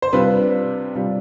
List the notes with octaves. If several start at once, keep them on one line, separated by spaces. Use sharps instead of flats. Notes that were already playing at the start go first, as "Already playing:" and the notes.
C5
C3 G3 D4 F4 B4
C3 G3 D4 F4